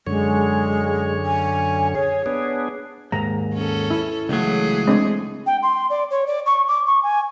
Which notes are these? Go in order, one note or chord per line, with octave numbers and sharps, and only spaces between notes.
F#2 D3 G#3 C#5
G#5
G#4 C#5
B3 D4 G#4
D#2 G#2 A#5
C#4 A4
E4
C#2 E3 F#3 A3 G#4
G#3 C4 D4
G5
C6
D5
C#5
D5
C#6
D6
C#6
G#5